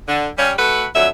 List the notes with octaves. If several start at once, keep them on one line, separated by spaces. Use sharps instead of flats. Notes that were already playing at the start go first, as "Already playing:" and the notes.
D3
G3 C#4
A3 F#4 A4 B4
F2 D3 F#3 E5